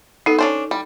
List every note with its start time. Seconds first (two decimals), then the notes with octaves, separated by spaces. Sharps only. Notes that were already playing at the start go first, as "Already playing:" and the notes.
0.26 B3 D#4 A4
0.39 C#4 D4 C5
0.71 G3